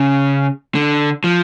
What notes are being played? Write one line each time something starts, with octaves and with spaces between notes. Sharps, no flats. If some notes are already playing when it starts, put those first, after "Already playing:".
Already playing: C#3
D3
F3